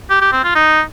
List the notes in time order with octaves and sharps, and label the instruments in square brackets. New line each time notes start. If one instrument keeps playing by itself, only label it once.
[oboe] G4
G4
C4
F4
D#4